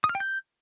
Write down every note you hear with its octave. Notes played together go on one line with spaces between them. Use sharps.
D#6
F6
G5
G6